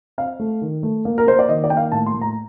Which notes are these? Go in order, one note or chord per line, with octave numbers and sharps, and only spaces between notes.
C4 F5
A3
D#3
A3
A#3
A#4
A#3 C5
D5
D#3 D#5
D5
A#3 G5
F5
A2 A5
C6
A2
A#5